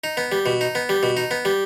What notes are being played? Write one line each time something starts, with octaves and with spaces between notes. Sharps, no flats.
D#4
B3
G3
B2
D#4
B3
G3
B2
D#4
B3
G3